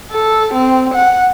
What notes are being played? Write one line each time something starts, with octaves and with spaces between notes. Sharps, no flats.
A4
C4
F#5